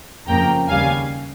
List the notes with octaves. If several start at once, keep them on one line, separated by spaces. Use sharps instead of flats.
F2 C#3 F3 A#3 G5 A#5
D#2 C#3 G3 F5 G#5